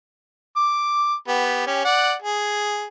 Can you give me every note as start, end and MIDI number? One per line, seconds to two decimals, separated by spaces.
0.56 1.15 86
1.28 1.63 59
1.28 1.63 67
1.67 1.82 61
1.67 1.82 67
1.85 2.13 74
1.85 2.13 78
2.22 2.86 68